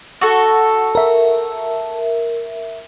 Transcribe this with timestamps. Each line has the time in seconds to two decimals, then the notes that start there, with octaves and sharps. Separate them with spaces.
0.21 F#4 A4
0.95 A#4 E5